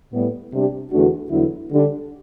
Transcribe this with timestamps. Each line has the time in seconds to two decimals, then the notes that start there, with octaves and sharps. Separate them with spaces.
0.13 A2 G3 B3
0.52 C3 G3 D4 G4
0.91 E2 D3 A3 D4 F#4
1.30 E2 D3 F#3 B3 E4
1.70 D3 G3 D4